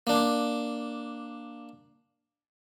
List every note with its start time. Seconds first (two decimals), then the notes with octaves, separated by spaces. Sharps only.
0.07 A#3 D4